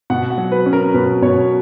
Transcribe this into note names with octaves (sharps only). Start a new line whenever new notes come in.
B2 F#5
F#5
F#3
B4
C#4
A#4
B2 B4
B2 C#5